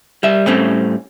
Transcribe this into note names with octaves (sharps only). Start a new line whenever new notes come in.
G3 E5
A2 G3 A3 C4 C#4